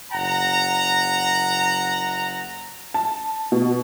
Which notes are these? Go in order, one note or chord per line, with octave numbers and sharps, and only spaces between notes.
F#1 F#5 A#5
A5
B2